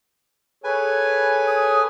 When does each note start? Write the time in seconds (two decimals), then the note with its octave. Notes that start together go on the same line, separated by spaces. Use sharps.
0.64 G#4 A4 B4 C#5 G#5
1.47 D#6